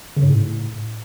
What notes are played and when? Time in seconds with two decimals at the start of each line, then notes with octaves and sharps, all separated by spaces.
0.17 C#3
0.23 G#2
0.29 A2